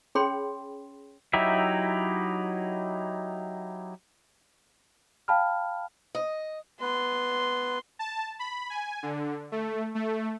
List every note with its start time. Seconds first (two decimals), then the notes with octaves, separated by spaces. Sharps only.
0.15 C#4 G#4 C#5 G5 B5 C6
1.33 F#3 D#4 E4 G4 E5
5.28 F5 G5 A5 B5 F6
6.15 D#5
6.82 B3 B4 C6
7.99 A5
8.39 B5
8.70 G#5
9.03 D3
9.52 A3
9.95 A3